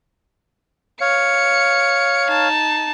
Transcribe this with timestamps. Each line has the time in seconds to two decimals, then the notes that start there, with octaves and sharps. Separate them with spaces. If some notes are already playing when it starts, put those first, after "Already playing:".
1.01 C#5 F5 C#7
2.27 D#4 A5